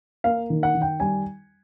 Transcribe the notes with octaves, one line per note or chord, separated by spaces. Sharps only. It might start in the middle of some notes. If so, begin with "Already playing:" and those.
A#3 F5
D#3
F#5
D#3
G5
G3 G#5